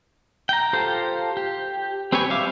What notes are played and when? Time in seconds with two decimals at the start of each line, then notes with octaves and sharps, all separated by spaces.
0.49 G5 A#5
0.73 F4 G4 A4 C5
1.37 G4
2.12 C4 G4 B4 C#5 G#5
2.30 G3 E5 F5 D6